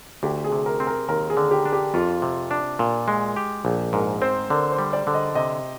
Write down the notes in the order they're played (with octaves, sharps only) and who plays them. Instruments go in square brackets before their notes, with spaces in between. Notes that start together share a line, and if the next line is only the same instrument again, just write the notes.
[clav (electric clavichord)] D2 [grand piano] G4
[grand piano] G#4
[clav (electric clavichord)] C3
[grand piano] A#4
[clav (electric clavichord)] C4
[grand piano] A#4
[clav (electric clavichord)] D#2 [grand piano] A#4
[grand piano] G#4
[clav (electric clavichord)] D3
[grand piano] G4
[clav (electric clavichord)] D4
[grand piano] G4
[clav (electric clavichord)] F2 [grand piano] F4
[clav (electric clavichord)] C3
D4
A#2
G#3
G4
[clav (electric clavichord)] A#1 [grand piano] G#4
[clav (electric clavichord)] G#2 [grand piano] A#4
[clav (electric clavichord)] C4 [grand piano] C5
[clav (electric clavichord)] D3 [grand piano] A#4
[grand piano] C5
[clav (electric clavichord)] G3
[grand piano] D5
[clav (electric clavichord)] D3
[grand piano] D#5
[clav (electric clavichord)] C3 [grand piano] D#5